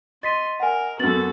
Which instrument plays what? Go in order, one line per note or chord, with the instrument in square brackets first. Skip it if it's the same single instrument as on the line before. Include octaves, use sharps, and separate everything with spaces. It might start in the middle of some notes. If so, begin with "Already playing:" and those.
[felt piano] D#5 [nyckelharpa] C6 [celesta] A6 B6 D#7
[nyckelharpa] A#4 [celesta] F#5 G#5
[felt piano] F#2 B3 [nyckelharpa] F#4 A4 [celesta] A6 F#7